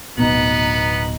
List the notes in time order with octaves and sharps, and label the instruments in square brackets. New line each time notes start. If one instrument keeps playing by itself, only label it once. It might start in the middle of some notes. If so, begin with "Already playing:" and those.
[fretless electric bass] D1 B2 [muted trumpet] B3 [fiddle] D#4 F#6